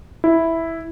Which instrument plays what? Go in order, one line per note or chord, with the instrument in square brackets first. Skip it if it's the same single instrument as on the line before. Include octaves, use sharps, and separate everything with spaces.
[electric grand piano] E4